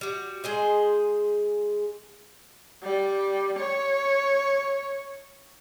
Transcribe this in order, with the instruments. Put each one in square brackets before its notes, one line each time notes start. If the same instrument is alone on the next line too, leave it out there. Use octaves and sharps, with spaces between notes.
[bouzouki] G3 F#4
G#3 G#4 C5
[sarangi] G3
C#5